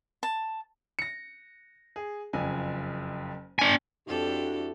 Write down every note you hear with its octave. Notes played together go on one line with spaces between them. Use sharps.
A5
A#6 C#7
G#4
F#1 F2 G#5
D4 G#5
F2 D4 E4 F#4 G4 A4